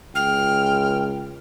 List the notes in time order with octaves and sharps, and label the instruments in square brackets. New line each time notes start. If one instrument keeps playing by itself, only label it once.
[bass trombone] C#2 [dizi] G5 [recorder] F6